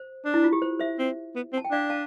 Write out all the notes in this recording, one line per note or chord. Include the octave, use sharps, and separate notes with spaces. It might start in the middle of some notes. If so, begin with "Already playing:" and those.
Already playing: C5
D4
E4
F4
G4
C5
C5 E5
C4
B3
C4
A5
G5
D4 D5 F5
F5 A5